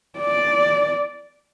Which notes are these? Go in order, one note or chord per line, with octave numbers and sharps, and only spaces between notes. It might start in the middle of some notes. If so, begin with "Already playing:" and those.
D5